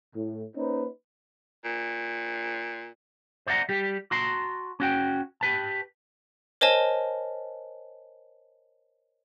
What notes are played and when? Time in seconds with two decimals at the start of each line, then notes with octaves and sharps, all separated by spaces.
0.16 A2
0.57 A#3 C#4 D#4 B4 C5
1.65 A#2
3.47 C5 D5 E5 F#5 A#5
3.69 G3 G4
4.11 F#4 A5 A#5 C6
4.80 C#4 F#4 G5
5.41 G4 B4 A5
6.61 A#4 C5 C#5 D#5 G#5 A5